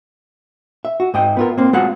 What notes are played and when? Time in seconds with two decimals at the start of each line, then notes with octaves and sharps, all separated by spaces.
0.85 E5
1.00 F#4
1.14 G#2 D#5 G5
1.37 B3 F4 A#4
1.58 A#3 C4
1.73 G#3 F4 F#4 F5 F#5